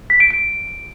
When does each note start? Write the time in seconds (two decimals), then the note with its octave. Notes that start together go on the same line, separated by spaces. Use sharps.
0.10 B6
0.20 D7
0.30 D7